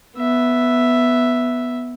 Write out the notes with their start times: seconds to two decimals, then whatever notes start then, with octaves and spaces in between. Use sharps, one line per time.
0.17 B3 E5